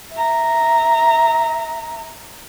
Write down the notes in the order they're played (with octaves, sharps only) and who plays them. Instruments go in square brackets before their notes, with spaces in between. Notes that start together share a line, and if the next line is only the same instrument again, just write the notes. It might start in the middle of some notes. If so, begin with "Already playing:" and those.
[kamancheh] E5 A#5